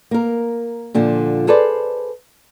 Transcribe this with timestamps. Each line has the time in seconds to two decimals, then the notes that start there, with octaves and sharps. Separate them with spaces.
0.11 A#3 A#4
0.94 A#2 D3 F3
1.47 G#4 A4 B4 C5 D5